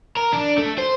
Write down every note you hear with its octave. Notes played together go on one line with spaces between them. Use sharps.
A#4
D4
A3
C5